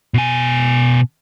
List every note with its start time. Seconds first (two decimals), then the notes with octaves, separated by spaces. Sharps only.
0.14 B2 G#5